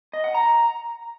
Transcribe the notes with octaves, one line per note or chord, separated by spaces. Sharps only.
D#5
F#5
A#5